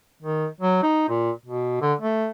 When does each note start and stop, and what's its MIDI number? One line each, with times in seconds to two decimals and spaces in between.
0.22 0.47 51
0.60 0.80 54
0.83 1.08 63
1.08 1.31 46
1.45 1.79 47
1.81 1.94 50
2.01 2.30 57